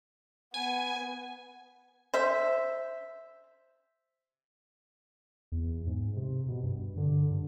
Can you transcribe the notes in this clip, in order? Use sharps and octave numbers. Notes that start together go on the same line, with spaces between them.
B3 G#5
C5 E5
E2
G#2
C3
B2
G2
D3
G2